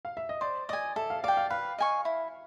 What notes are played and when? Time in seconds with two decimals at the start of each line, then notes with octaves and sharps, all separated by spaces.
0.05 F5
0.17 E5
0.29 D#5
0.41 C5 D5
0.69 D5 D#5 G#5
0.96 A4 E5
1.10 F5
1.24 D5 F5 G5
1.37 F5
1.50 B4 F5
1.78 D#5 G#5 C#6
2.05 E4